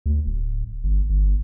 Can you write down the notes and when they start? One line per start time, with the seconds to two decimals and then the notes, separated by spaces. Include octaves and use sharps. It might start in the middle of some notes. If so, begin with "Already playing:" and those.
0.06 D2
0.26 D1
0.84 G1
1.10 G1